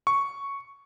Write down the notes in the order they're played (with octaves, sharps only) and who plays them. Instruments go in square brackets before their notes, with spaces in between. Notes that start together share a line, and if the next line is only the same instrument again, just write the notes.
[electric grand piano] C#6